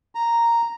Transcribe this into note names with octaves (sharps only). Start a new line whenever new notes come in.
A#5